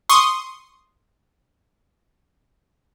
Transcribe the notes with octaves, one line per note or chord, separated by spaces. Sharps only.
C6 C#6 D#6